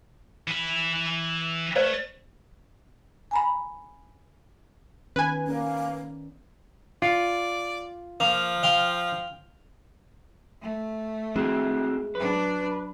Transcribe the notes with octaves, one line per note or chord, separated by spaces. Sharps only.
E3 B5
A3 B4 C5 D5
G#5 A#5 B5
D#3 B3 C#4 B4 G#5
A#3 C#4 A#4 D5
F4 D5
F3 A#3 F5
F5 G5 C6
A3
G#3 C4 E4 F#4
F#3 D4 B4